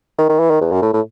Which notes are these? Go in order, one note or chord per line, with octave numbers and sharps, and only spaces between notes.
D#3
D#3
E3
D#3
E2
F#2
A2
A2